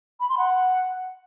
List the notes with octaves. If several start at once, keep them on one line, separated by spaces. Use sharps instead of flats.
B5
C6
F#5